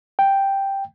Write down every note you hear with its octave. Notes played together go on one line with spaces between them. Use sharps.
G5